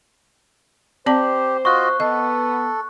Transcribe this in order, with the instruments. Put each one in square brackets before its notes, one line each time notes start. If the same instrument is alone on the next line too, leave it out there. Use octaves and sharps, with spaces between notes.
[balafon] C4 D5 A5 [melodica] G4 [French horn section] C5
[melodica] F4 F#4 D#5 [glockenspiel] C#6 F#6
[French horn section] B3 [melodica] A4 [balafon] D#5